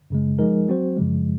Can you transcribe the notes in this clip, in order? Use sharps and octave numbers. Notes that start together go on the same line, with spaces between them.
F#2 C#3 G#3
F3 G#3 D#4 A#4
F#3 C4 F#4 C5
F#2 C#3 F3 G#3